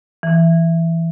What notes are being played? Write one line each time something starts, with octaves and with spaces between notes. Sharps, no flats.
E3